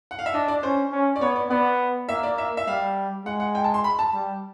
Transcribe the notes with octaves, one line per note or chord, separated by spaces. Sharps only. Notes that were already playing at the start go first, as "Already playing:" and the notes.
F#5
F5
E5
D4 D#5
D5
C#4 C5
C#4
D5
B3 C#5
D5
B3 D5
A#3 E5
D5
E5
E5
G3 F5
G#3 F#5
F#5
G5
A5
C6
B5
A5
G3